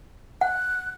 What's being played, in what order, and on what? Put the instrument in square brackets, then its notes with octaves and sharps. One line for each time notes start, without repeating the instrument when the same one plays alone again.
[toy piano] F#5 [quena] F#6